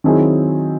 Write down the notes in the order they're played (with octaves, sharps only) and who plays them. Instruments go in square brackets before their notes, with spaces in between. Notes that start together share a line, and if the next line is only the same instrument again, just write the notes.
[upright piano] D#3 F#3 C4 E4 G#4